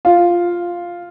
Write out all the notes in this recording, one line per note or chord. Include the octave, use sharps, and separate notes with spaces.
F4